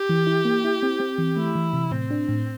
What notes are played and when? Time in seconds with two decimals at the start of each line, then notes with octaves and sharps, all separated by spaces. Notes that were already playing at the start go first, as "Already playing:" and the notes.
Already playing: G4
0.09 E3
0.27 E4
0.45 A#3
0.64 E4
0.83 C4
1.00 C4
1.18 E3
1.37 A3 E4
1.55 E3
1.73 C3
1.91 A2 C4
2.11 D4
2.29 A2